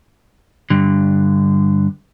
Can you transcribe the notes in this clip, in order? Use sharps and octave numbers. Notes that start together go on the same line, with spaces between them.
G2 D3